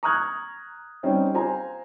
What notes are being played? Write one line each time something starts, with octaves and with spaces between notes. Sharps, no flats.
A#5 C#6 D#6 F6 F#6 G#6
G3 C4 C#4 D#4
F4 C5 G#5 A#5